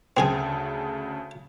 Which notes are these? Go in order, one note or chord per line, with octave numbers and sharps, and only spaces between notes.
D2 C#3 C4 G#4 G#5 A5